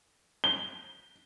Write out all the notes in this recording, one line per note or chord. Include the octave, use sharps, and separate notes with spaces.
G7